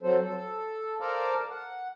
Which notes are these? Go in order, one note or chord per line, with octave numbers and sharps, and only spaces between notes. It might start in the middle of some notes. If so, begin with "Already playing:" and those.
F#3 C4 A4 C5
A4
A4 A#4 C5 D5 F5 A#5
F#5